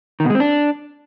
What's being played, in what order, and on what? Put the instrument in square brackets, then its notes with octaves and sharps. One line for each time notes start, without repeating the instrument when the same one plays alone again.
[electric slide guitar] D#3
B2
G#3
C4
D4